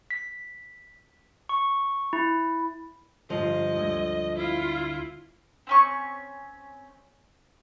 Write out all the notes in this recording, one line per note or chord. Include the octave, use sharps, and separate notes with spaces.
B6
C#6
E4
G1 F3 C5 D#5
D2 A3 G#6
E4 F4
C4 C#4 C#6